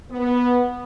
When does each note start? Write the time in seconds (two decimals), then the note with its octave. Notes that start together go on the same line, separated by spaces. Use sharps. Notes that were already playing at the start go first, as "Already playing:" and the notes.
0.11 B3